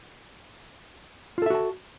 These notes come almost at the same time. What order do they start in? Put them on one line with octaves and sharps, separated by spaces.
F4 A4 E5 F#4 A5